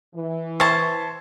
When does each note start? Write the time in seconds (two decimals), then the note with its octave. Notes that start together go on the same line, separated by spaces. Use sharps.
0.14 E3
0.60 C5 E5 A5 C#6 G#6